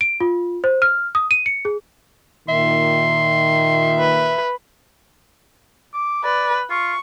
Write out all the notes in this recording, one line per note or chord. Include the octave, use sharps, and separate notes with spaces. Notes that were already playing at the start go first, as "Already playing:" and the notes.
D7
F4
C5
F6
D#6
D#7
C#7
G#4
A#2 D#3 E5 C6
B4
D6
B4 D5
F4 C#6